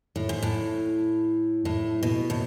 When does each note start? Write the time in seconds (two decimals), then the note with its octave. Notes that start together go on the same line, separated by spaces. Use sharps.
0.16 A2
0.29 G#2
0.42 A2
1.65 A2
2.03 B2
2.30 A2